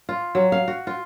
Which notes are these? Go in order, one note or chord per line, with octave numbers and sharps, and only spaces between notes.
F4
F#3
F5
F#4
F4